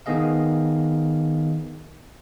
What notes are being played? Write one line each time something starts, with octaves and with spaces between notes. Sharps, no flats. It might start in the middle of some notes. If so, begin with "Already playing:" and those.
D#3 B3 G#4 D#5 F5